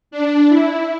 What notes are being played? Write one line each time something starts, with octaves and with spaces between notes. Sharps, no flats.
D4
E4